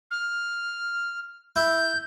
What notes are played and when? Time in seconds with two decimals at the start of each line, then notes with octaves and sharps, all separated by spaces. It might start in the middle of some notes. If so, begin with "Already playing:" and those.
0.11 F6
1.56 E4 G6